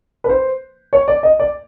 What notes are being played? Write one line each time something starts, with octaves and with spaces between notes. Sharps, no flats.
B4
C5
C#5
D5
D#5
D5